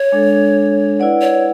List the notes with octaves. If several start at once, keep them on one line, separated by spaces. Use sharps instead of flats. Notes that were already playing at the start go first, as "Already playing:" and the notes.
Already playing: C#5
G#3 D4 A4
E4 B4 D5 F#5
C#5